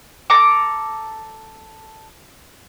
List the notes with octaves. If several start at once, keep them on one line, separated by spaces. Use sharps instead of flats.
A4 A#5 D6